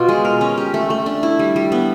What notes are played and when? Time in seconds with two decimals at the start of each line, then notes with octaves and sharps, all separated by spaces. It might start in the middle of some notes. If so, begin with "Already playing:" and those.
Already playing: B2 F4
0.09 G#3
0.25 A#4
0.41 C#4
0.57 G4
0.74 A3
0.90 A3
1.06 D4
1.23 E4
1.39 G3
1.56 G3
1.72 B3